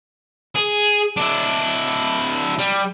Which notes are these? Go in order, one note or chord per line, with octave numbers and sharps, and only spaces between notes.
G#4
D4 E4
G3